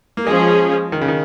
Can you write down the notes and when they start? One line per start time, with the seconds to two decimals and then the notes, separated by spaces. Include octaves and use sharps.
0.17 A#3
0.27 F3 G#3 C#4 G#4
0.92 D#3
1.01 C#3
1.08 D#3